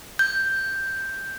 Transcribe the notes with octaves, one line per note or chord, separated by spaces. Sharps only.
G6